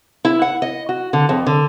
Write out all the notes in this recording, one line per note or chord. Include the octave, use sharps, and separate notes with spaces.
E4
F#5
D#5
F#4
D3
F2
D3